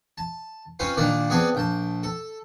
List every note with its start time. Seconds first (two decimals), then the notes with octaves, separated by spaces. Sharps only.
0.18 A5
0.79 C4 C#4 F4 B4 C5
0.97 A#2 D#3 A#3 D4 D5
1.30 B3 C4 G#4 D5 A5
1.55 A#1 G5 A5
2.03 A4